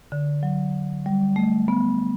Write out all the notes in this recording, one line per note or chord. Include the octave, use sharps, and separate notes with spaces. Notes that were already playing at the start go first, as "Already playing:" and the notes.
D3
F#3
G3
A3
B3